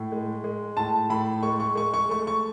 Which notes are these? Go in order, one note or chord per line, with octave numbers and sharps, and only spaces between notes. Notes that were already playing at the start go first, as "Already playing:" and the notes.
Already playing: A2
G#3
G#3
A2 A5
A2 B5
G#3 C#6
C#6
G#3 C#6
C#6
A3 C#6
C#6